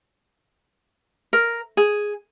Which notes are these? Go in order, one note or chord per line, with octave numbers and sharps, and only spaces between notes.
A#4
G#4